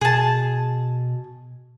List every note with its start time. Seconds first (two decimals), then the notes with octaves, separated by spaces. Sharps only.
0.01 B2 G#4 A5